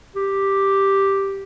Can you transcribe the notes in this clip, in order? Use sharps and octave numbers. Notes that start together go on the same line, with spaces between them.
G4